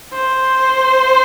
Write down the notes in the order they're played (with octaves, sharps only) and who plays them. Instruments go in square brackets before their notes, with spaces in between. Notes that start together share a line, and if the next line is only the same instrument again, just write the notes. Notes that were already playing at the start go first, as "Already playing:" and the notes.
[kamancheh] C5